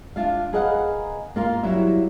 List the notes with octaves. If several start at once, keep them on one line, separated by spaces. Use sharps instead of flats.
D4 F4 E5 F5
G#4 A#4 B4 D#5 F5 F#5
A#3 F4 A#4
F#3 G3 E4 E5